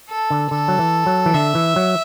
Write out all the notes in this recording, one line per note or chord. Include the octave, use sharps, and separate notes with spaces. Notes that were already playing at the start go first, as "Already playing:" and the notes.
A4
D3
D3 A4
F#3
E3
F#3
E3
D3 E5
E3
F#3